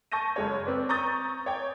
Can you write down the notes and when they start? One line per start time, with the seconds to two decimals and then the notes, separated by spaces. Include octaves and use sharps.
0.12 A5 C#6 G6 A#6 D#7
0.36 F#1 G#3 C#5
0.65 C4 B4 D5
0.89 A#5 C#6 D#6 G6 A6
1.46 C#5 G5 D6